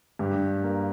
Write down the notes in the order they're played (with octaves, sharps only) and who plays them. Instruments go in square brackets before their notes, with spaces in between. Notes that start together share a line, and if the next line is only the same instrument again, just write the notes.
[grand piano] G2 G4
A#3